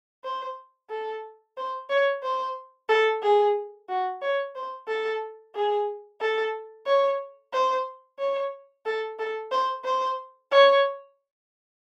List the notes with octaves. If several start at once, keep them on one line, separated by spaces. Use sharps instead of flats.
C5
A4
C5
C#5
C5
A4
G#4
F#4
C#5
C5
A4
G#4
A4
C#5
C5
C#5
A4
A4
C5
C5
C#5